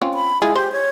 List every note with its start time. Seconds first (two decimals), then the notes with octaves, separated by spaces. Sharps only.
0.02 C4 C#4 F4
0.14 B5
0.42 G#3 E4 F4 G#4
0.56 G4 C5
0.72 C#5